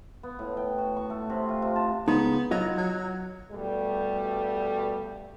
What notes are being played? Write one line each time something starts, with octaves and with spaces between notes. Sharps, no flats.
B3
A2
G5
F#4
C#6
A3
C3
F4
C3
A5
C#2 G#3 B3 D#4
F#3 F4 D#5 A#5
F#3
G2 B2 G3 A3